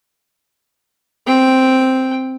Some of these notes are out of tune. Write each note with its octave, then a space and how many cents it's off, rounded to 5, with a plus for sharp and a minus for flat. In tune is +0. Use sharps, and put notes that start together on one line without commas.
C4 +0 G5 +0